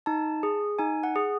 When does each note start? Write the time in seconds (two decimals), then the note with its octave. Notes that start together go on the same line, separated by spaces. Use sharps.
0.06 D#4 A5
0.43 G#4
0.79 D#4 G#5
1.03 F#5
1.16 G#4